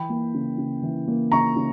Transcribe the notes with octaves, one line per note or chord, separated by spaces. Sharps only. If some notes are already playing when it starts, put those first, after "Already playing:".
Already playing: E3 G5 B5
A#3
C#3
C#3
E3
A#3
C#3 A#5 C#6
C#3